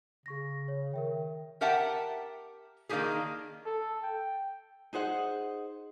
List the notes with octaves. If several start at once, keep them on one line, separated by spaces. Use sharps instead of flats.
C#3 G#4 C#6 A#6
C#5
D#3 A#4 E5 G5
G4 A#4 E5 F#5 G5 A5
D#3 A#3 D4 D#4 G4 G#4
A4
G5
D#4 G#4 C5 F#5